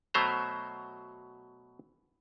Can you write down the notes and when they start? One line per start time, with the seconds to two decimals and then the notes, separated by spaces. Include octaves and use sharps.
0.14 B2 F#3 A3 C5 E5 A#5